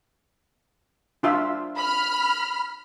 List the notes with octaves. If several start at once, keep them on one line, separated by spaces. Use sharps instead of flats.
D4 F4 E5
B5 F6